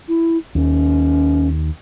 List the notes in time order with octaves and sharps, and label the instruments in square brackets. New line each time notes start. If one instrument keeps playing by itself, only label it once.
[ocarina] E4
[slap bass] D#2 [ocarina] C#4